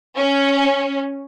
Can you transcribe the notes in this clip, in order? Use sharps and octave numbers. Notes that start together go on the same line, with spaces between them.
C#4